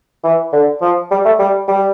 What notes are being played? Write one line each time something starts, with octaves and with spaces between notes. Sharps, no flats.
E3
D3
F3
G3
A3
G3
G3